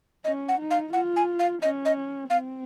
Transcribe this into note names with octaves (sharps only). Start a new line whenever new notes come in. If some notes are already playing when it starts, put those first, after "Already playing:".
C#4 D#5
F#5
D#4
F5
F4 F#5
G#5
F5
C#4 D#5
D#5
C4 F5